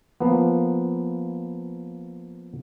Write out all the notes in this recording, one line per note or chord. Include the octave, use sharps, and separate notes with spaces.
F3 A#3 B3